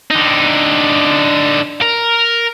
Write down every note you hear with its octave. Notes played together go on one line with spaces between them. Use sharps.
D3 D#4
A#4